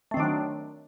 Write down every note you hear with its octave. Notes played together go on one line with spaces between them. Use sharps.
D#3 F#3 A3 C4 D4